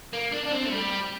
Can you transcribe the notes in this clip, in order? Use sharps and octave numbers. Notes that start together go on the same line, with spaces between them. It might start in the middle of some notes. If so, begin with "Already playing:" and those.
A#3
D4
D4
C4
A3
G3